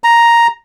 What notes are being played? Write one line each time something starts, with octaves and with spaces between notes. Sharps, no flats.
A#5